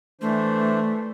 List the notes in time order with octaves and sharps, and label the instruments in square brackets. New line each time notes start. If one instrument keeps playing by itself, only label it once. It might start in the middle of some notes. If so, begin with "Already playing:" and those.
[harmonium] E3 D4 C5 [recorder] A3